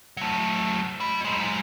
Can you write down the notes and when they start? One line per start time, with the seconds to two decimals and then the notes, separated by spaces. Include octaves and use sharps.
0.17 F#3 A3
1.00 D#5 B5
1.25 F#3 G#3